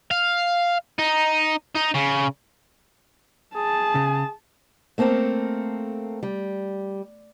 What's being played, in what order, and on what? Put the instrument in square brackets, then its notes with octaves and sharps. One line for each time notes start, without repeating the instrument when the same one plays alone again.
[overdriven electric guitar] F5
D#4
D#4
C#3
[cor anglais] G#4 [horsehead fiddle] A5
[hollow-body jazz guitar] C#3
[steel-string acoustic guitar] A3 A#3 C4 A4 A#4
G3